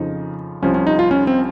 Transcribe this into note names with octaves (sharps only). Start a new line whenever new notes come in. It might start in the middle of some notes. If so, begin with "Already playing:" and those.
Already playing: F2 C#3 F3 D#4
C2 C3 F3 C#4
C#4
D#4
F4
C#4
C4